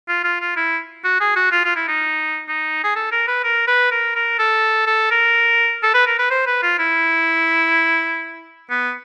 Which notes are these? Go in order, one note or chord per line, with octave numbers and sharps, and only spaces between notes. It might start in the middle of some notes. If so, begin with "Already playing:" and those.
F4
F4
F4
E4
F#4
G#4
F#4
F4
F4
E4
D#4
D#4
G#4
A4
A#4
B4
A#4
B4
A#4
A#4
A4
A4
A#4
A4
B4
A#4
B4
C5
B4
F4
E4
B3